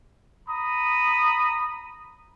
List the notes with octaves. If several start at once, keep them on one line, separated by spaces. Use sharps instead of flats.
A#5 B5 D#6